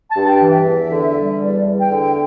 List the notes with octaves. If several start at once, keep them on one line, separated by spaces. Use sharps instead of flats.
A5
G2
G5
E3
E5
E2
D3
G3
E2 D5
E2
G5
D3
G5